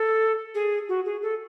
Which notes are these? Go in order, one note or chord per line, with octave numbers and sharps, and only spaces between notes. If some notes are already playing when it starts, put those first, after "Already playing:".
Already playing: A4
G#4
F#4
G#4
A4